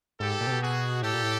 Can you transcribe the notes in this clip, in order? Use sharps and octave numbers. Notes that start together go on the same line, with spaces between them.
G#2 G4 A4
A#2
C3
B2
F#4 G#4
A2 G4 A4
A#2
A2